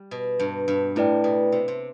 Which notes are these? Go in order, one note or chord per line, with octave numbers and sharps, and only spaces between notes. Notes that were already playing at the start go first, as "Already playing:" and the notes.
Already playing: G3
B2
G2
G2
A2 A3 E4 B4 D5 G5
B2
C3
C3